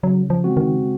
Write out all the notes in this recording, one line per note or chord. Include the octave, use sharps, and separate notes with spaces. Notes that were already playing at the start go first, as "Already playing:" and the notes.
C#3 F#3
F3
G#3 C4 F#4
D#3